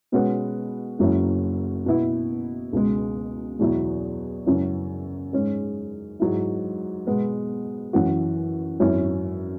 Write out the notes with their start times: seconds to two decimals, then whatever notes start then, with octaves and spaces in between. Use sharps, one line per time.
0.12 B2 G#3 C#4 F#4 B4
0.99 F#1 F#2 F#3 C#4 E4
1.86 B2 B3 E4
2.73 C#2 B2 G#3
3.59 E2 B2 F#3 E4
4.46 F#2 C#3 F#3 C#4 E4
5.33 G#2 G#3 C#4
6.20 G#2 F#3 E4
7.07 B2 G#3 B3
7.93 F#2 E3 C#4 F#4
8.80 G#1 F#2 F#3 C#4 E4